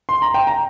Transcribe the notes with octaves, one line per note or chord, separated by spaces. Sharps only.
C6
A#5
G5
A#5